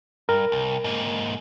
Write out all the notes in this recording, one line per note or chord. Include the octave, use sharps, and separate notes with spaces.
G2 A#4
C2
G#2 A#3